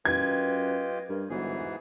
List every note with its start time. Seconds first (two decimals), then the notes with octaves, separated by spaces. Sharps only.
0.05 F#2 F4 G4 B4 D#5 G#6
1.09 G2 A#4
1.30 G1 G#2 E3 F#4 G#4